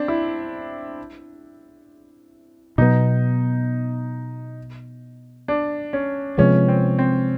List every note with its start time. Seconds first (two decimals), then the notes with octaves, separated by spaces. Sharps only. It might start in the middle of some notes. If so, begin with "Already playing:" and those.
Already playing: C4 D4
0.08 E4
2.78 B2 F#3 B3 D#4
5.48 D4
5.93 C#4
6.38 C3 F3 G#3 B3 C#4
6.68 C4
6.99 C4